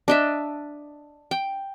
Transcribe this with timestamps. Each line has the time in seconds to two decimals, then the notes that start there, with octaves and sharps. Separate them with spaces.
0.08 D4 D#5 E5
1.31 G5